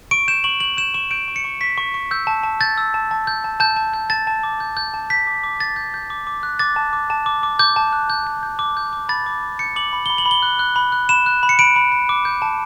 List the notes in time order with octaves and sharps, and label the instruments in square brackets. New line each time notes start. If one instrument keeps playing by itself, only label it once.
[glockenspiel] C#6 D7
G6 E7
C#6 F#7
G6 F#7
G6 E7
C#6 E7
G6 D7
C#6
C#7
C#6
C#6 B6
C#6
C#6
E6 G6
A5
A5
G6 A6
E6
A5
A5
G6
A5
A5 G6
A5
G6
A5 A6
A5
D6
G6
G6
A5
G6 B6
D6
D6
G6 A6
G6
G6
D6
D6
F#6
D6 A6
A5
D6
A5
D6
D6
D6 G6
A5
F#6
G6
G6
G6
D6
G6
D6
B5 A6
D6
D6
G6 C#7
D6 F#7
B5
B5 G7
F#7
B5
G7
F#6
F#6
B5
F#6
B5 E7
F#6
B5
C#7
B5 D7
B5
B5
D6
G6
A5